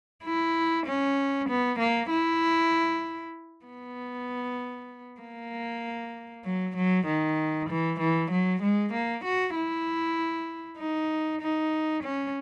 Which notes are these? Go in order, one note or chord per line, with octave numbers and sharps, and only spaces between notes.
E4
C#4
B3
A#3
E4
B3
A#3
F#3
F#3
D#3
E3
E3
F#3
G#3
A#3
F#4
E4
D#4
D#4
C#4